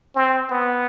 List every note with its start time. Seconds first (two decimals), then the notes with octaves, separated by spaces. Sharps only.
0.15 C4
0.50 B3